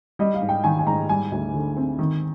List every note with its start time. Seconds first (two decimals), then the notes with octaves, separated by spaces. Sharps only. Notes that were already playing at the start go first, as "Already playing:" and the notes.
0.19 G3 D#5
0.34 F5
0.42 G#2
0.49 G5
0.64 D#3 G#5
0.79 G#5
0.87 G#2 A#5
1.09 G3 G#5
1.32 D2
1.54 D3
1.77 C4
1.99 D#3